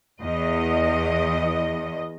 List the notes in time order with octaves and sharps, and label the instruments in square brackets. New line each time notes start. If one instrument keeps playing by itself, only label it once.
[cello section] E2 D#5